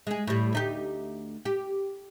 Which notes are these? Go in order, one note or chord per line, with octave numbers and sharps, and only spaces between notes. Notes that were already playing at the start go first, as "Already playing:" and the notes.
G#3 G#4
A2 G3
D2 D#4 G4
G4